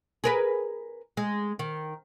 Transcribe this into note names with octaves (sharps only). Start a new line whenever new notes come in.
G#4 A#4 B4
G#3
D#3